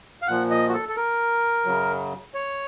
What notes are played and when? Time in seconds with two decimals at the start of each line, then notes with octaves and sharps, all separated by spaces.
0.22 F5
0.28 A#2 F3 F#5
0.50 D#5
0.69 F#4
0.73 A4
0.89 A4
0.96 A#4
1.66 F#2 C#3 F#3
2.34 C#5